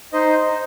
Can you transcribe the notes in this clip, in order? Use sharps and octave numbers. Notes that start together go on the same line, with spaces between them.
D#4 C5 D#5